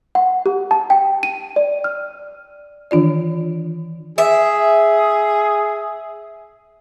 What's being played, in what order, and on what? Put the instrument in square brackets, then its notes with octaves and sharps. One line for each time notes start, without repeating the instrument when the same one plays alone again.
[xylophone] F#5
G4
A5
G5
D#7
D5
F6
[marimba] D#3 E3 D4 F4 D5
[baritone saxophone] G#4 [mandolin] E5